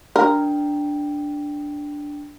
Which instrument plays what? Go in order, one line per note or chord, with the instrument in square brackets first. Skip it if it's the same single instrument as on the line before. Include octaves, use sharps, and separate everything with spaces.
[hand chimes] D4 G5 [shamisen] A#4